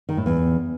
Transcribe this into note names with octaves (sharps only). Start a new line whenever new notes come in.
D#3
A2
E2